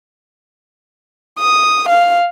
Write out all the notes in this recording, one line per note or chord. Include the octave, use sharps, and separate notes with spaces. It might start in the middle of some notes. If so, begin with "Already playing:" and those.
D#6
F5